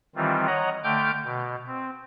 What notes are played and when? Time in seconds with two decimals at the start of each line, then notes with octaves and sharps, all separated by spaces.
0.16 D#3 E3 G3 C4 F4
0.47 C#5 D#5 F#5 A#5
0.84 D3 A3 G5 D6 F6 G6
1.25 B2
1.67 C4